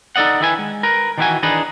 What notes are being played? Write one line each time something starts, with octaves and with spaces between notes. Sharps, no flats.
D#4 A4 D5 D#5 F#5
D#3 E4 B4 G#5
G#3
A#4 B4
D#3 E3 D4 E4 F#4 G#5
D#3 E3 D4 D#4 G#4 B4